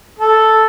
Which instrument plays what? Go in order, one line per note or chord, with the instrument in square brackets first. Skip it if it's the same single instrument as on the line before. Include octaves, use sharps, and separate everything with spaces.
[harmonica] A4